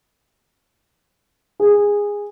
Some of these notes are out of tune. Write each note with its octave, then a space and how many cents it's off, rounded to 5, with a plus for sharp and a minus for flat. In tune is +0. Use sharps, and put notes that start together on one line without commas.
G#4 -15